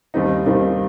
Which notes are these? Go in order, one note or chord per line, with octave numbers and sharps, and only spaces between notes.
D#2 D#3 G3 C4 D#4
D#2 D#3 G3 C4 D#4